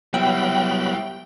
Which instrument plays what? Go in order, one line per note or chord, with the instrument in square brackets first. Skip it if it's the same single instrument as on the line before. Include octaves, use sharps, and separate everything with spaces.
[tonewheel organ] F#3 B3 B5 [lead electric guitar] G3 E4 [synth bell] G5